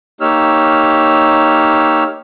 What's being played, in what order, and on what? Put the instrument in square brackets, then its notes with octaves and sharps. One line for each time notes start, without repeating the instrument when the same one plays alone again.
[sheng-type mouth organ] A#3 D#4 G4 C#5 E6 F6